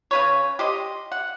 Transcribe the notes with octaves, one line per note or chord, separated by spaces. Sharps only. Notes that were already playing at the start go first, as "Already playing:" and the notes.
C#3 B4 C#5
G4 C5 D#5
F#5